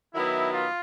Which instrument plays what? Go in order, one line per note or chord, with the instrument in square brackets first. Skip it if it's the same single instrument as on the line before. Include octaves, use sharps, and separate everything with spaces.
[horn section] D#3 F#3 B3 E4
F4